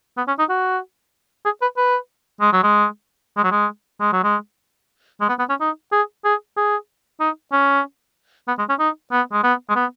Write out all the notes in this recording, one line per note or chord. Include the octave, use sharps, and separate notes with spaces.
B3
C#4
D#4
F#4
G#4
B4
B4
G#3
F#3
G#3
G#3
F#3
G#3
G#3
F#3
G#3
G#3
B3
B3
C#4
D#4
G#4
G#4
G#4
D#4
C#4
B3
G#3
C#4
D#4
B3
G#3
B3
G#3
B3